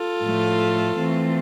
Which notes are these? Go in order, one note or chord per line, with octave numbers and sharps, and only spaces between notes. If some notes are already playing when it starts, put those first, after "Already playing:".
Already playing: F4 A4
A2 F3 A3
E3 A3 C4